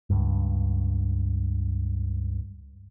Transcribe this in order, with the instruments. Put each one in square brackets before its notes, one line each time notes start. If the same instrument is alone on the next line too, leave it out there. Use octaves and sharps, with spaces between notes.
[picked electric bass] C#2 G2